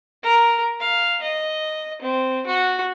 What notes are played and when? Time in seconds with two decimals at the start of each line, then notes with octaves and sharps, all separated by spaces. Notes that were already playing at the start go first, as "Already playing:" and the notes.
0.23 A#4
0.80 F5
1.22 D#5
2.02 C4
2.46 F#4